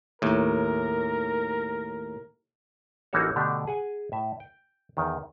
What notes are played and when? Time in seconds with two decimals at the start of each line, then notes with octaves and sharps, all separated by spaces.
0.22 D#2 A2 A#4
3.13 A1 E3 A#3 D#4 F#4 C#5
3.36 B2 D3 A3 D4 G4
3.67 G#4 F#5 G#5
4.12 A2 E5
4.40 G5
4.97 E2 D#3